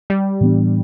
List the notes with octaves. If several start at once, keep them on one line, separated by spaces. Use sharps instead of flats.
G3
A2 E3 B3 D4